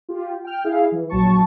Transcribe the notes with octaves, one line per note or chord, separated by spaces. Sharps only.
F4 G4
G5 F6
E4 G#4 F5
E3
A#1 F#3 A5 C#6